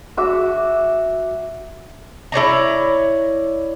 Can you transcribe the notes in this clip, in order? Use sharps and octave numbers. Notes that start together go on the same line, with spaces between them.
F#4 E5 D6
E4 C#5 D5 A#5